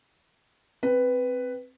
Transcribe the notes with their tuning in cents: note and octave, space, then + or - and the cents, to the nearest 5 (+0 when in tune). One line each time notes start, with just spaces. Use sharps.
C4 +0 B4 +5